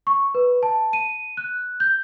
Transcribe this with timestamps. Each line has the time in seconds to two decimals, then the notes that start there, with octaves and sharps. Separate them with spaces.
0.07 C#6
0.35 B4
0.63 A5
0.93 D#7
1.37 F#6
1.80 G6